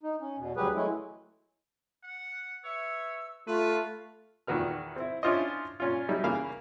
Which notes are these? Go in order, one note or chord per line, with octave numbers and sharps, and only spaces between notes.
D#4
C#4
E2 B2
D2 F#3 G3 G4 G#4 B4
E3 F#3 G#3 A3 C#4 E4
F#5
B4 C#5 E5 E6
A3 F4 B4
E2 A#2 D#3 F#4 B4 F6
C4 E4
C#4 D4 E4 F4 C5 D#5
A#2 C#4 F4
F#3 G3 D#4 E4
C#3 E3 A#3 F5 B5